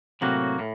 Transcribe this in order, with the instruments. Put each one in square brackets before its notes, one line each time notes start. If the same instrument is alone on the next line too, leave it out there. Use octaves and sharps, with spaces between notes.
[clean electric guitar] A2 F#3 A#3 F#4 [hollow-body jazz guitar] C3
[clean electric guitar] A2